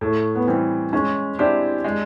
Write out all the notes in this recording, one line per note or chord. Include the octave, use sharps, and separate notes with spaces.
A2 A3
B3
E3 G3 C4
G#3 C#4
C4 D4 E4 G4 C5
G#3